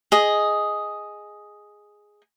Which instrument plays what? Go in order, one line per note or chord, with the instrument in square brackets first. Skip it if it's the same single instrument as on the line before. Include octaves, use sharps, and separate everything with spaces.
[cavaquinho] G#4 D#5